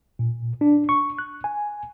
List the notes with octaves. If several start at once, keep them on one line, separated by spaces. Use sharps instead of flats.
A#2
D4
C#6
F#6
G#5